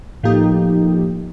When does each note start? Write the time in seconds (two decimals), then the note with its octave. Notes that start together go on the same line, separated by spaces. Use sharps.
0.23 A2 F3 A#3 D#4 G4